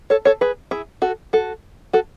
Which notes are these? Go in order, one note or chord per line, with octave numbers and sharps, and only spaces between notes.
A4 C#5
A4 C#5
G#4 B4
E4 G#4
F#4 A4
F#4 A4
F#4 A4